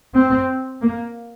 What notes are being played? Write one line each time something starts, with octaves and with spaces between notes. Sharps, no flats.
C4
A#3